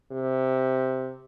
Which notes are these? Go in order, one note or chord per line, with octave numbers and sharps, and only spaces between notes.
C3